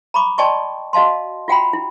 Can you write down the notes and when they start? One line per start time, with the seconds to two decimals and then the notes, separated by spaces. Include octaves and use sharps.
0.14 A#5 B5 C#6 D6
0.38 D5 D#5 G5 A5 C6 C#6
0.93 F#4 D#5 F5 A5 C6
1.48 F4 F#4 F#5 G5 A#5 B5
1.73 E4